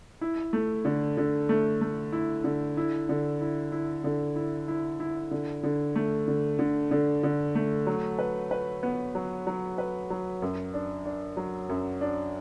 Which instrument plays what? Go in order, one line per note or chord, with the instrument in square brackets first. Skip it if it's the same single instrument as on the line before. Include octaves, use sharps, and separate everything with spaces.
[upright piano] E4
A3
D3
D3
A3
A3
E4
D3
E4
D3
E4
E4
D3
E4
E4
E4
D3
D3
A3
D3
D3
D3
D3
A3
F#3
B4
B4
B3
F#3
F#3
B4
F#3
F#2
D4
D4
F#3
F#2
D4